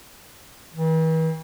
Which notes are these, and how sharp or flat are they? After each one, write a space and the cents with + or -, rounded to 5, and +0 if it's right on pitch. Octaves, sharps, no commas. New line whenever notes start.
E3 -45